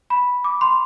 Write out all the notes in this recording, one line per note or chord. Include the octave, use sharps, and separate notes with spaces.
B5
D6
C6